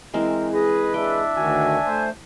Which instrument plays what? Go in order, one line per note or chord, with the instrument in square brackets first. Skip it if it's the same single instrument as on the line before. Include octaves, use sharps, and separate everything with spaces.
[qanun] E3 G#3 C4 [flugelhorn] A#4
[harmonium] G#4 D#5 [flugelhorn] B4
[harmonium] G#3 [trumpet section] D4 E5 [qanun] G5
[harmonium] D2 D#3 F#4 [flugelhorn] G#5
[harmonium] A3 C5